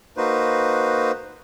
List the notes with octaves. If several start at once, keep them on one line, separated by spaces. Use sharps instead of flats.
A#3 D#4 F#4 B4 C5